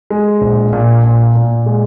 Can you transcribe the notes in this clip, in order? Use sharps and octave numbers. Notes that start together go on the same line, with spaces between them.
G#3
A#1
A#2
A#2
A#2
G#3